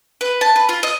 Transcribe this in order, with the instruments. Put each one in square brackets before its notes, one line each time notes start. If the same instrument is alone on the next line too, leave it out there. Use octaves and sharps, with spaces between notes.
[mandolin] B4
A5
B4
F4
D#5